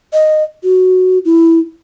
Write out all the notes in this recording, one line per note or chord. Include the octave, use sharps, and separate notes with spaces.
D#5
F#4
E4